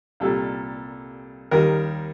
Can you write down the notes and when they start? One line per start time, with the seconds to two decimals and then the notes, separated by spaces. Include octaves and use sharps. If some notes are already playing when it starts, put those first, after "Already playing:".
0.20 C2 A#2 G3 A4
1.51 D#2 D#3 G3 A#4